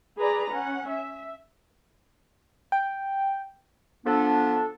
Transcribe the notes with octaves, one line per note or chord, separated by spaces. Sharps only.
G#4 B4 D5 A#5
C#4 F#5
E5
G5
F3 B3 D4 A4